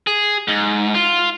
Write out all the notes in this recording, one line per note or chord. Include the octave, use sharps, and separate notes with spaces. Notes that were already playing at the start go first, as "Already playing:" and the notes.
G#4
G#2
F4